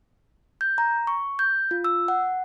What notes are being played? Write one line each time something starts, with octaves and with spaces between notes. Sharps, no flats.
G6
A#5
C#6
G6
F4
E6
F#5